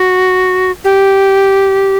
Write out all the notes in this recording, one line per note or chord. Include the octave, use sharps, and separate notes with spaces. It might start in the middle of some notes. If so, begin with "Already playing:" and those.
Already playing: F#4
G4